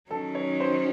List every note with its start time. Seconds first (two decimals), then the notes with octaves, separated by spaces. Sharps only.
0.11 D#3 F#3 C#4 A4
0.35 C#5
0.60 C5